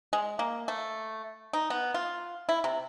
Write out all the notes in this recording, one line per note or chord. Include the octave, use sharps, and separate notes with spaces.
G#3
A#3
A3
D#4
B3
F4
E4
C3